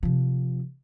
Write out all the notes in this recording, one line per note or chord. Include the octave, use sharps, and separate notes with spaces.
C3 F3